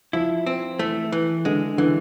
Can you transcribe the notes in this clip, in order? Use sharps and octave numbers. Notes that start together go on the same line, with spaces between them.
F3 E4
C4
E3 A3
E3
D3 G#3
D3 E3